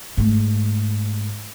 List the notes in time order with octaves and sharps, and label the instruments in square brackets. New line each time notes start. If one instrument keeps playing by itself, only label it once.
[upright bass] G#2 A3